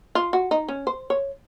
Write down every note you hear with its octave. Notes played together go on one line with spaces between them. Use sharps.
F4
F#4
D#4
C#4
C5
C#5